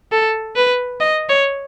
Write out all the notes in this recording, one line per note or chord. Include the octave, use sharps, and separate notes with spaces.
A4
B4
D#5
C#5